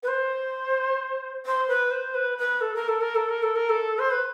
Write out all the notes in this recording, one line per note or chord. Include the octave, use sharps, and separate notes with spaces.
B4
C5
C5
B4
C5
B4
B4
A4
A#4
A4
A#4
A4
A#4
A4
A#4
A4
C5
B4